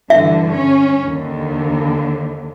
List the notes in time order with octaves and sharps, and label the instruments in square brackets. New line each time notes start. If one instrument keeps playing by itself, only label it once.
[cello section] G2 D3 E3 [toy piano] E5
[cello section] C#4
D#2 D3